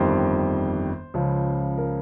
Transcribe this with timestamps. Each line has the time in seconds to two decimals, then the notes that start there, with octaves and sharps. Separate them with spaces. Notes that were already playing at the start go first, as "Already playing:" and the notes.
Already playing: G1 F2 D#3 G3 C5
1.14 C#2 C#3 F3
1.78 A#4